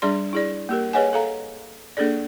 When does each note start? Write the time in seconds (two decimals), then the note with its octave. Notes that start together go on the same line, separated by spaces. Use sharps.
0.02 G3 D4 G#4 D5 C6
0.33 E4 G#4 D5
0.69 A#3 G4 A#4
0.93 G#4 B4 C#5 D#5 F#5 G#5
1.13 A4 F5 A#5
1.97 A#3 D4 G#4 A4 D5